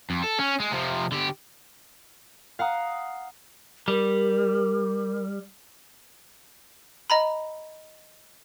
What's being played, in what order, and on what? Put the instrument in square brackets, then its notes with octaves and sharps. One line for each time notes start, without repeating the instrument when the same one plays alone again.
[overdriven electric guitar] F2
A4
C#4
G#3
C3 F3
D3 G4
[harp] F5 F#5 A#5 D#6
[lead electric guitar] G3 [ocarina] A#4
[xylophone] D#5 A#5 B5